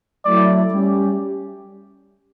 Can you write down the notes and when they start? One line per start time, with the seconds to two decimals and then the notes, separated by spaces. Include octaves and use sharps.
0.25 F#3 A3 E4 D5
0.72 G3 C#4 G4